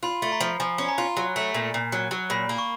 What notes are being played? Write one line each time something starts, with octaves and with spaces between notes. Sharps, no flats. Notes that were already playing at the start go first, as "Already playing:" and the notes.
F4 B5
A3
A#5
F3
F3 G#5
C#4
A#5
F4
F#3
A3
A#2
A#2
F#3
F#3
A#2 B5
A#3
C#6